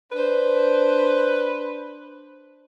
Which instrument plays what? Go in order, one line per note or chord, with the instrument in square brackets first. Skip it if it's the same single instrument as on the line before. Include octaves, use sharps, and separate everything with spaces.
[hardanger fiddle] D4 C5 [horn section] B4